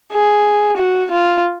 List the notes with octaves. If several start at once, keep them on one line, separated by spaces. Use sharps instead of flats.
G#4
F#4
F4